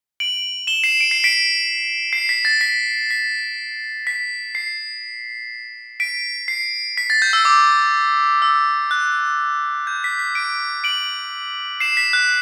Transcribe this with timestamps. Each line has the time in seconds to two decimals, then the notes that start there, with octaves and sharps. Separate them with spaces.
0.20 D7 F#7
0.67 E7 G7
0.84 C7 E7
1.00 D7
1.11 C7
1.24 B6 D7
2.13 C7
2.29 B6
2.45 A6
2.61 B6
3.11 B6
4.07 B6
4.55 C7
6.00 B6 D7
6.48 C7
6.97 B6
7.10 A6
7.22 G6
7.33 E6
7.45 D6
8.42 E6
8.91 F#6
9.87 G6
10.04 B6
10.19 B6
10.35 B6 D7
10.84 D7 F#7
11.80 C7 E7
11.97 B6
12.13 F#6